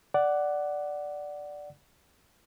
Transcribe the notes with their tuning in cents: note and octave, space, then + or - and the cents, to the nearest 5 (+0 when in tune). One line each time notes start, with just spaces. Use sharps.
D5 +0 F#5 +10